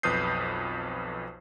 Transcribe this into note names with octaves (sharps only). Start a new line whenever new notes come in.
B1 F2 B4 D#6 G6 C7